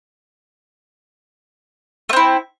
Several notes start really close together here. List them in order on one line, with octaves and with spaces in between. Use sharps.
A3 C4 E4